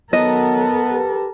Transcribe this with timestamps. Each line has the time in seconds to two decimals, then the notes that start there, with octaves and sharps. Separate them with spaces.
0.13 D#3 F#3 B3 A4 A#4 D#5
0.89 G4 B4